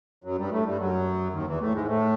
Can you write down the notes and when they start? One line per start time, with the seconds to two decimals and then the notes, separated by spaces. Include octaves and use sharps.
0.24 F#2 F#3
0.38 G2 G3
0.52 A2 A3
0.65 G2 G3
0.79 F#2 F#3
1.33 D#2 D#3
1.47 E2 E3
1.61 A2 A3
1.74 G#2 G#3
1.88 A2 A3